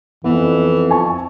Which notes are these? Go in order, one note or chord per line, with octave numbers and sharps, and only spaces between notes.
F2 E3 B3
G#5 A5 C#6